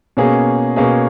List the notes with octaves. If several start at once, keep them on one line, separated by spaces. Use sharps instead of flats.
B2 A#3 C#4 G#4
B2 A#3 C#4 G#4